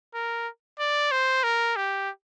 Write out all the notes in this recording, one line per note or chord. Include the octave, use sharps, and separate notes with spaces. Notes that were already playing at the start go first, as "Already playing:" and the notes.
A#4
D5
C5
A#4
G4